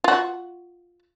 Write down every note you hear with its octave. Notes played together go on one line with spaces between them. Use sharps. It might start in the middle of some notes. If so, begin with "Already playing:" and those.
F4 F#4